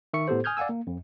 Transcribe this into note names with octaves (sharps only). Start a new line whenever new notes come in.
D#3 E5 C#6 C#7
A2 B3 G4 A4 C5
G#5 D#6 F6 G6 G#6
D5 F5 F#5 G#5 E6
A#3
F2